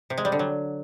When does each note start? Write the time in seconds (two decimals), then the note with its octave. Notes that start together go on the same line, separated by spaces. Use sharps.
0.10 C3
0.18 G#3
0.25 G3
0.32 D3
0.39 F#3